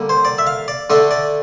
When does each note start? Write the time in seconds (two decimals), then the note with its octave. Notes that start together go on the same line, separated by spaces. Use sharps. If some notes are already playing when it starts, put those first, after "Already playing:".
Already playing: D3 G3 A#3
0.09 C5
0.25 D5
0.38 E5
0.47 F5
0.68 D5
0.90 D3 A3 D4
1.11 D5